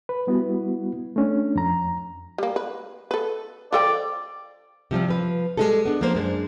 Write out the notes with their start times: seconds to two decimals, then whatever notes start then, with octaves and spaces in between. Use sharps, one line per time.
0.09 B4
0.27 G3 B3 E4 F#4
1.16 A3 C#4 D4
1.55 F2 A#5
2.38 G3 A#3
2.56 B4
3.11 A4 B4
3.72 F3 A4 D5 G5
4.91 C3 F3 G3 C4
5.08 F3 B4
5.57 G3 G#3 B3 D#4 G#4 A4
5.86 B3 D4
6.01 F3 A#3 C5
6.15 F#2 G#3 D4